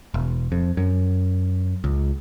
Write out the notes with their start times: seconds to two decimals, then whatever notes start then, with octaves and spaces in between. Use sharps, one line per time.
0.14 E1
0.52 F2
0.77 F#2
1.84 C#2